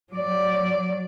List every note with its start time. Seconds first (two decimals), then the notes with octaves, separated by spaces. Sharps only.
0.13 F#3 D5